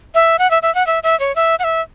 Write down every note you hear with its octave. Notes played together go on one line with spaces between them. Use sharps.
E5
F#5
E5
E5
F#5
E5
E5
C#5
E5
F#5
E5